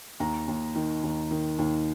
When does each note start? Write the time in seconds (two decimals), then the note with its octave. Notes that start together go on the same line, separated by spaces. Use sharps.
0.20 D#2 A#5
0.48 D#2
0.75 D#3
1.03 D#2
1.31 D#3
1.59 D#2